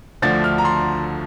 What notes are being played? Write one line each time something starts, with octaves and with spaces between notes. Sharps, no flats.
D2 D3 F3 A3 D4 A6
F6
A#5
C6